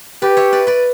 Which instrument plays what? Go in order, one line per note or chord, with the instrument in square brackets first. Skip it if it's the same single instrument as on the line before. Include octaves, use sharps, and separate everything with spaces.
[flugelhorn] G4 [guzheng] B4 D5
[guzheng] C#5 E5
B4 D5
B4 D5